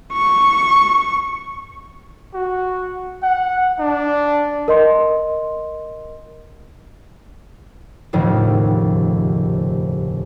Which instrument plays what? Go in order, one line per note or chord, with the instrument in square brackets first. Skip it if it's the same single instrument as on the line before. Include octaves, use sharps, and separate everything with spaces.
[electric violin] C#6
[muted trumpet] F#4
F#5
D4
[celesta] A#4 D#5 C6
[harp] F1 D#2 A2 C#3 F3